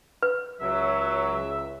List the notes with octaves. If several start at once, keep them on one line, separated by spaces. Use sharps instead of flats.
B4
C#2 F#3 E5